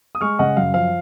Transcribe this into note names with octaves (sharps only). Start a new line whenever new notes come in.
D#6
G#3 C#6 F6
C#3 D#5 F#5
F#2 F5
F3 F5